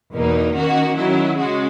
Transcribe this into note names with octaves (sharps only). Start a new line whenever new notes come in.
E2 B2 A#3 D#4
D#3 A#3 C#4 F#4
D#3 F#3 C#4 E4
C#3 G#3 C#4 F#4